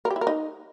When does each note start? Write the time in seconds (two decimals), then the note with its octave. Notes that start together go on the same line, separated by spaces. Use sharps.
0.05 A#4
0.11 G4
0.16 E4
0.21 A#4
0.27 D#4